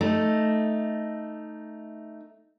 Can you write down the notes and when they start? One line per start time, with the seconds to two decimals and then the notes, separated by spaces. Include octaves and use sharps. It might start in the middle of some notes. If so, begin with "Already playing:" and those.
0.01 A3 D#4